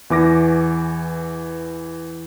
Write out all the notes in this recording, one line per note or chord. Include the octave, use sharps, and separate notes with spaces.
E2 E3 D6 A#6